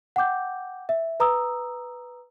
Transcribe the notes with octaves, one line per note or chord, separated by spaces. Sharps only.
F#5 G5 D6 G6
E5
B4 A#5 D#6 E6